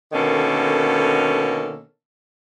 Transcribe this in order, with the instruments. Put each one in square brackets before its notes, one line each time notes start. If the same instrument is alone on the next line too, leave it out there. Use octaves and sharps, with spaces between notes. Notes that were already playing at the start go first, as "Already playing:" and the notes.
[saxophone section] B2 D3 D#3 A#3 C#4 A4